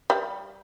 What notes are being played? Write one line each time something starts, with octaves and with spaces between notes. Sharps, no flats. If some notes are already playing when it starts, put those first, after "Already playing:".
G3